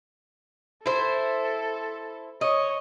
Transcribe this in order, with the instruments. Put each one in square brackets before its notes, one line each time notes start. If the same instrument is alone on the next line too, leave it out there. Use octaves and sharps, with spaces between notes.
[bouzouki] E4 C5 [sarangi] A4
[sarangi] C#5 [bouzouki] D#5